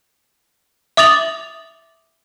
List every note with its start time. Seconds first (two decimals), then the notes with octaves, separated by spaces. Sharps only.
0.97 E5 D6 D#6 A6 F7 F#7